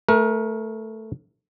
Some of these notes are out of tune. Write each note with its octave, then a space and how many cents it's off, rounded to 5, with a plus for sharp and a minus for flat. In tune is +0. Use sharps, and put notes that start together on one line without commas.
A3 +0 A#4 +30